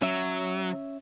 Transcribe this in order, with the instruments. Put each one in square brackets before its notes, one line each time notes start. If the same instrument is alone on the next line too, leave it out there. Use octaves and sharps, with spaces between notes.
[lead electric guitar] F#3 [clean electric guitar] C#4 E5